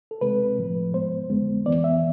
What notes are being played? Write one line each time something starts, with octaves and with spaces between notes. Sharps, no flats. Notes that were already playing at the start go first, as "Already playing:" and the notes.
A4
D2 C3 G#3 C4 B4
A2 F3 A3
G#2 G#3 B3 C5
F2 D3 G#3 B3
F2 E3 B3 D5
E5